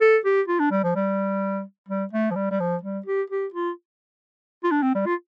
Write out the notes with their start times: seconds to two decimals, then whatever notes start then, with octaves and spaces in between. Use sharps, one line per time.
0.01 A4
0.25 G4
0.48 F4
0.59 D4
0.71 G3
0.83 F3
0.96 G3
1.88 G3
2.13 A3
2.31 F3
2.35 G3
2.51 G3
2.60 F3
2.83 G3
3.06 G4
3.30 G4
3.54 F4
4.64 F4
4.71 D4
4.82 C4
4.95 G3
5.06 F4